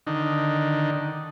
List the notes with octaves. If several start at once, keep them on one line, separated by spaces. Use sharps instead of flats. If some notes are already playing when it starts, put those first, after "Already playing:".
D3 D#3